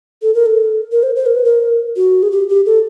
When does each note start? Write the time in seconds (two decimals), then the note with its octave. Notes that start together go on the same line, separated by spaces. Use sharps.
0.22 A4
0.34 A#4
0.46 A4
0.92 A#4
1.03 C5
1.16 C5
1.26 A#4
1.35 B4
1.45 A#4
1.96 F#4
2.23 G#4
2.32 G4
2.49 G4
2.66 A4